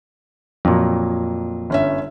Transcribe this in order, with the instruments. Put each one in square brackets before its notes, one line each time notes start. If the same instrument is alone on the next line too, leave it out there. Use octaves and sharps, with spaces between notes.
[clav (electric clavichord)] F2 A#2 [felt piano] F#3
[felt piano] G1 C#4 E5